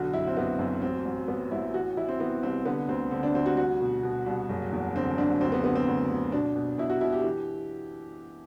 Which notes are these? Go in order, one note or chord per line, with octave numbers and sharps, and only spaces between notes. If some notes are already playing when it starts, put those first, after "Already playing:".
Already playing: B1 D3 F#4
F#1 E4
C4
F#1 B3
F#2 C4
A1 C4
A1
A1 B3
A1 E4
E3 F#4
E3 E4
C4
E3 B3
C2 C4
D3 B3
D2 C4
D3 C4
D4
D2 C4
F#4
C2 F#4
B2
B2
C2
F#1
E2
D3 C4
F#1 D4
D2 C4
B3
D3 B3
C4
D2
D2
B2 D4
B2
B2 E4
F#4
B2 E4
G4
E3